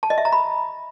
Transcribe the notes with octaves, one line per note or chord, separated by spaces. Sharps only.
A5
D#5
E5
A#5
B5